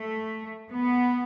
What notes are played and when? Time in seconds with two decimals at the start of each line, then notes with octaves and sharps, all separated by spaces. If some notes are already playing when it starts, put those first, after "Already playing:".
Already playing: A3
0.71 B3